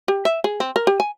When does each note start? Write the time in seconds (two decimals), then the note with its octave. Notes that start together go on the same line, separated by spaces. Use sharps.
0.08 G4
0.25 E5
0.44 G#4
0.60 C4
0.76 A#4
0.87 G4
1.00 G#5